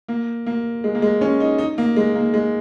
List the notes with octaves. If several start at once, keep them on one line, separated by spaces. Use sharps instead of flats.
A#3
A#3
G#3
A#3
G#3
C#4
D#4
D#4
A#3
G#3
A#3
G#3